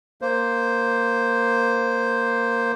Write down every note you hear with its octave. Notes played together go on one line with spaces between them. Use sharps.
A#3 C5